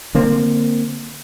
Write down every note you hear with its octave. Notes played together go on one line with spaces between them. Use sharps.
D3 A#3 C4